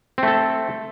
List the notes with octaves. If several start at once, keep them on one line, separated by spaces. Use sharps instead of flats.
A3 C4 A4